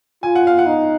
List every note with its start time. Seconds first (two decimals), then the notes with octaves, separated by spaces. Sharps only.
0.23 F4 G#5
0.35 F#5
0.47 F5
0.58 F#5
0.66 D#4